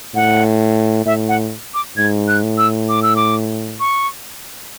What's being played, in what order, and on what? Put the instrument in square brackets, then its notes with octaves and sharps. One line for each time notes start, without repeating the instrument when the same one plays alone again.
[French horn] A2 [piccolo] F#5
[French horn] A2 [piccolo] E5
[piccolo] F#5
D6
[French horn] G#2 [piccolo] G#6
[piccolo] F#6
[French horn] A2
[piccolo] E6
D6
E6
D6
C#6